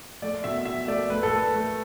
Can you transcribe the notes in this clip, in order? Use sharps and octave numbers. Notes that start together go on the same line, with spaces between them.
A3 D5
B2 E5
B2 E5
A3 D5
A3 B4
A4
A3 B4
A3